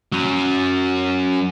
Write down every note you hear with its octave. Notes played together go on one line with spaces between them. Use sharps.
F#3 C#4